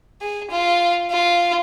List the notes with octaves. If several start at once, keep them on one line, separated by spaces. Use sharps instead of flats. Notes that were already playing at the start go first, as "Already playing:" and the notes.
G#4
F4
F4